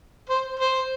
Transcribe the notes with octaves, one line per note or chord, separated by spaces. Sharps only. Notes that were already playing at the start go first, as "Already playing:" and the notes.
C5
C5